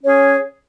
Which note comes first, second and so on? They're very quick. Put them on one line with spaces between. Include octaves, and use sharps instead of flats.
C#4 C#5 G#4